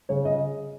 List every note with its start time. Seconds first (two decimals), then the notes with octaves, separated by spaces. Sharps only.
0.09 C#3 C#5
0.25 C#3 D#5